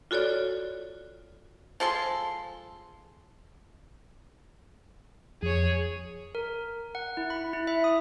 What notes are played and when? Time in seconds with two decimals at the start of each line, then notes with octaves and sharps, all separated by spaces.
0.11 F4 F#4 A4 C#5 D5
1.80 F3 G#3 A4 C6
5.42 F2 G#4 C#5
6.35 A#4
6.95 F#5
7.17 E4
7.30 B5
7.53 E4
7.67 E5
7.84 D#6